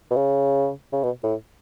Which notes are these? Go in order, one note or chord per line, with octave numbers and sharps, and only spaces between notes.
B2
C#3
C#3
B2
A2